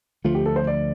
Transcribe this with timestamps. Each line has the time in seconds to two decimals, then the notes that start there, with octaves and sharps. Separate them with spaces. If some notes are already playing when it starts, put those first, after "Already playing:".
0.24 D2 D3 F3 A3 F4
0.35 G4
0.46 A4
0.56 C5
0.67 D5